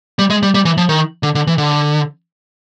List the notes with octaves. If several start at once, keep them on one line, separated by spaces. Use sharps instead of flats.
G3
G#3
G3
G3
E3
F3
D#3
D3
D3
E3
D3